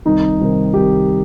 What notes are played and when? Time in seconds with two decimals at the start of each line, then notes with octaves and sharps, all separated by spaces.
0.05 C2 C3 D#3 D#4
0.40 C2 C3 D#3
0.74 C2 C3 D#3 G4